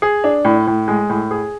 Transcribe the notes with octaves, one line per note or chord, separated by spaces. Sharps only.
G#4
D4
A2
A2
G#3
A2
G#4